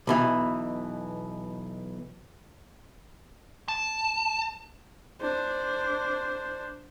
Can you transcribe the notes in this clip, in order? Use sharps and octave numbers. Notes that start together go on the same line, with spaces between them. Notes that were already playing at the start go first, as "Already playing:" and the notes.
B1 B2 E3
A5
D4 C5